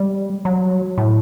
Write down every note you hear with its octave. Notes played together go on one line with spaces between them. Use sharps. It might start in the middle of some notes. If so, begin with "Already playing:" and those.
Already playing: G3
F#3
A2